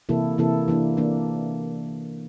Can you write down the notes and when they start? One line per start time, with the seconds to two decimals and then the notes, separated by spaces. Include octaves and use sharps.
0.09 C3 E3 A#3 E4 A4
0.38 C3 E3 A#3 E4 A4
0.68 E3 A#3 D4
0.97 E3 A#3 D4